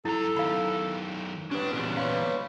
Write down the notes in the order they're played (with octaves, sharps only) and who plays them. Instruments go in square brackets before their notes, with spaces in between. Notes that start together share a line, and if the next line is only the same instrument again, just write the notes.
[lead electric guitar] F#2 A#5 [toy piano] E4 [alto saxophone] A4
[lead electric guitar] F#2 D#3 [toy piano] F5 B5
[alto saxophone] G3 [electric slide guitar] C#4 B4 [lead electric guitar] D4
[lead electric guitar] E2 A#2 [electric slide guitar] C#4 F#4 G#4
[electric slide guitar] B4 C#5 [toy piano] F5